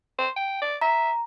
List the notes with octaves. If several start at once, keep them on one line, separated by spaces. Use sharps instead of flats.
C5
G5
D5
E5 A#5